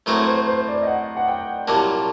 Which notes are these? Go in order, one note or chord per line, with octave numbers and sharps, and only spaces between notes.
A2 F#3 A3 C4 F#4 A#4
C5
C5
D5
D#5
F#5
F#5
G5
C2 A#2 F#3 A#3 A5